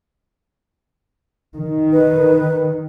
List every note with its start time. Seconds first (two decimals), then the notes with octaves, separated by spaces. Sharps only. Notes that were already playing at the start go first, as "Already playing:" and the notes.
1.56 D#3
1.93 B4